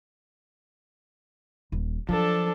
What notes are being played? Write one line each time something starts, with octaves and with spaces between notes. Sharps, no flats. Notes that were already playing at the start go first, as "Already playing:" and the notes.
D#1
F3 F#3 D4 A4